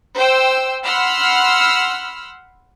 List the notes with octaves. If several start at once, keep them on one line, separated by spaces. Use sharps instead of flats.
C5 G5 E6
F#5 B5 C6 E6 F6